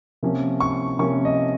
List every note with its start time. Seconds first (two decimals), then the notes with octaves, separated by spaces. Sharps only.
0.23 C3 F3 A#3 C#4
0.60 C#6
0.99 C3 F3 A#3 C#4 C#6
1.25 D#5